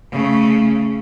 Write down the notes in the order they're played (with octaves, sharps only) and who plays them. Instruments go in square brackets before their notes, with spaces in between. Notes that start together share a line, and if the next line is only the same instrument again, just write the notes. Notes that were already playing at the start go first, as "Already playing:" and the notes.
[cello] C#3 A3